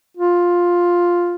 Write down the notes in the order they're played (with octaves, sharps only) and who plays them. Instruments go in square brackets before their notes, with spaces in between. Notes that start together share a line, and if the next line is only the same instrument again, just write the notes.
[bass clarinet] F4